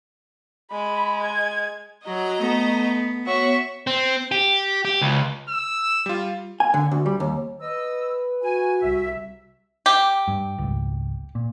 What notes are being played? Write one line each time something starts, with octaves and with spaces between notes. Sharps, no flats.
G#3 B5
G#6
F#3 F#4 D#5 A#5
A3 B3
B3 F#4 C#5 E5 F#5 C#6
C4
G4
G4
C#2
E6
G3 F4
G#5
D3
D2
G3
D#2
B4 D#5 E6
F#4 G#5
C2 E5
G4
G2
G#1 C#2
A#2